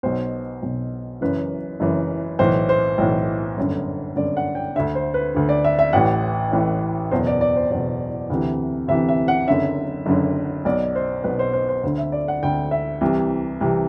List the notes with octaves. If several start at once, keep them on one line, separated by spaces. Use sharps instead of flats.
B1 B2 C5
B1 B2
F#1 F#2 E3 B4
F#1 F#2 E3
B1 A2 E3 C5
C5
B1 A2 E3
G1 F#2 D3
G1 F#2 D3 D5
F#5
G5
D2 D3 E5
C5
B4
D2 D3
D5
E5
E5
A1 A2 E3 F#5
A1 A2 E3
F#1 E2 B2 C5
D5
D5
C5
F#1 E2 B2 D5
D2 C3 E3
D2 C3 E3 E5
E5
F#5
F#1 F#2 D3 E5
F#1 F#2 D3
B1 B2 D5
C5
B1 B2 B4
C5
C5
C5
D2 D3 C5
E5
D5
F#5
D2 D3 G5
E5
C2 C3 E3
C2 C3 E3